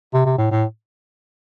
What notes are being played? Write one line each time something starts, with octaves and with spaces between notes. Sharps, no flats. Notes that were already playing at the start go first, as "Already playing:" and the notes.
C3
C3
A2
A2